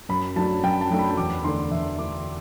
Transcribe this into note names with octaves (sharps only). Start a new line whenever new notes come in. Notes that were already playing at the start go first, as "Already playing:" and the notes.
F#2 B5
F#3 A3 D4 A5
F#2 G5
A5
F#3 A3 D4
B5
E2 D6
D3 A3 D4 C6
E2 E5
D3 A3 D4 D6